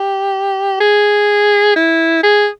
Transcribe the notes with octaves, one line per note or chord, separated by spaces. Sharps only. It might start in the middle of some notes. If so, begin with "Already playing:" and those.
Already playing: G4
G#4
E4
G#4